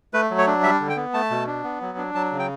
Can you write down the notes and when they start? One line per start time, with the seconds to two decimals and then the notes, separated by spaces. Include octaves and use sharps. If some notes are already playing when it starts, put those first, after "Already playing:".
0.14 A3 B4
0.30 F#3
0.38 C#5
0.47 D4
0.63 G3 E5
0.80 D3
0.89 G5
0.97 B3
1.14 A3 A5
1.30 B2
1.47 D4
1.64 B3
1.81 F#3
1.98 D4
2.15 F#3 A5
2.32 C#3
2.39 G5